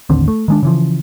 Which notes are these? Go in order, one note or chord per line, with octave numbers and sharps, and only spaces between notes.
A1 D#2 D3 C4
A3
D#3 G#3 D4
C#3 E3 F3